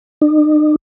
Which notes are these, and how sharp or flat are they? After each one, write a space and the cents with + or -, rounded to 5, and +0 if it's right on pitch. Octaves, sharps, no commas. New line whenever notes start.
D#4 -45